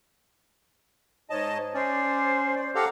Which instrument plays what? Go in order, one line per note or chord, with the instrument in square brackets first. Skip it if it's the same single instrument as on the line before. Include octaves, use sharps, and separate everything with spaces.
[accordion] G#2 D#5 A5 [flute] C#5
[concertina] C#4 [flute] C5 [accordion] D5
[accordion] D5
[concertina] G4 A4 [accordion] F5 F#5 A#5